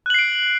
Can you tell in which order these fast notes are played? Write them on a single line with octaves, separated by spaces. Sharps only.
F#6 F#7 C7 D7